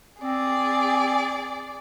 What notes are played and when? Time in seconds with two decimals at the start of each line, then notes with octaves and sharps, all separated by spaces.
0.22 C4 G#4 D5